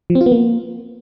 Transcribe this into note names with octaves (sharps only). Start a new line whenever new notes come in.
F3
C4
F4
B3
A#3